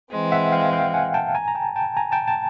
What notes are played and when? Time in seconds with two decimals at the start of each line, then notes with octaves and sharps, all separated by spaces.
0.11 E3 G#3 C4
0.32 E5 F#5
0.52 F5 G5
0.73 F5 G5
0.94 F#5 G#5
1.14 G5 A5
1.35 G#5 A#5
1.48 A#5
1.55 G5 A5
1.76 G5 A5
1.97 G#5 A#5
2.12 G5 A5
2.27 G5 A5